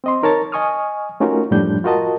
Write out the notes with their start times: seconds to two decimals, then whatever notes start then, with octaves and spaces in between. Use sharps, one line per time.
0.04 C4 D#5 C6
0.23 D#4 A#4 C#5 A5 A6
0.52 D#5 G#5 C#6 D#6 F6
1.20 A3 C#4 D#4 F4 F#4 A#4
1.51 F#2 A2 F3 G3 D4 G6
1.84 F4 F#4 A#4 D#5 A5